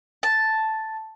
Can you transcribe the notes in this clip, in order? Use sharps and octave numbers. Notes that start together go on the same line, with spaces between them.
A5